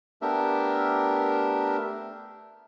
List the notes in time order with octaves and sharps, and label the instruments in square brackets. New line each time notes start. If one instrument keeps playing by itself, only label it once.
[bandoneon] A3 B3 D4 G4 A#4 E5